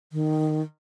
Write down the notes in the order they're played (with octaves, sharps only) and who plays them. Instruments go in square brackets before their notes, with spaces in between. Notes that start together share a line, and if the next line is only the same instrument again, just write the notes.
[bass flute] D#3